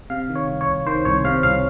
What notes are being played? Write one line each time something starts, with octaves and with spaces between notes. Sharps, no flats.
C3 F5
D#3
C#5
C2
C#5
C2
D#3 C5
C2 C#5
C3 F5
C2 F5